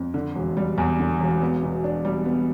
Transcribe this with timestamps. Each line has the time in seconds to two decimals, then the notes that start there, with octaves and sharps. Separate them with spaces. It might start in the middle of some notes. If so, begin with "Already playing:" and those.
Already playing: F2
0.14 D3
0.35 E1
0.57 G3
0.78 E2
0.99 D3
1.20 E1
1.42 B3
1.63 B2
1.84 D4
2.05 G3
2.26 B3